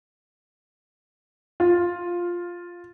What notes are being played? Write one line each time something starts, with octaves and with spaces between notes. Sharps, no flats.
F4